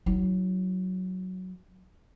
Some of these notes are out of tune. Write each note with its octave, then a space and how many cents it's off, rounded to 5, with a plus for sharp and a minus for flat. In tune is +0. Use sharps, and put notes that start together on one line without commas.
F#3 +0 E4 -45